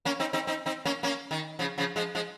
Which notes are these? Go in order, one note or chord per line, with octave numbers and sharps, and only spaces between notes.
A#3 C#4
C4 D#4
C4 D#4
C4 D#4
C4 D#4
A#3 C#4
A#3 C#4
D#3
C#3 F3
C#3 F3
F3 G#3
F3 G#3